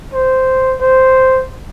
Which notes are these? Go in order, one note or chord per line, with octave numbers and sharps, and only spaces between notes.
C5
C5